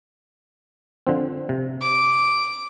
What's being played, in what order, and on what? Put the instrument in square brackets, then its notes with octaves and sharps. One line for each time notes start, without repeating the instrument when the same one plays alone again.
[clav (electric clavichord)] D3 F3 C4
C3
[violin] D6